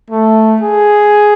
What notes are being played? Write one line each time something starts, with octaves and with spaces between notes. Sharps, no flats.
A3
G#4